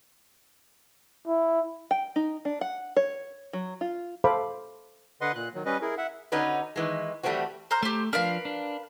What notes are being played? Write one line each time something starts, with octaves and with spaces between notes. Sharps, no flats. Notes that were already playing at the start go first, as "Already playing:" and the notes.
E4
G5
D#4
D4
F#5
C#5
F#3
F4
A4 C5 F5 B5 D6
D3 B4 D#5 F#5 C6
A#2 F#6
D#3 F#3
G3 C#4 B4 D#5
E4 G#4 A#4
E5 F#5
D3 C#4 D#4 F#4 B4
D#3 E3 G#3
E3 G3 A3 B3 C4 F#4
C5 A#5 F6
A3 G4 C5
F3 D4 A#4 B4 F5
D4